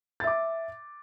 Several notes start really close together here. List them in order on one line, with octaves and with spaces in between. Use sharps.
A6 E5 D6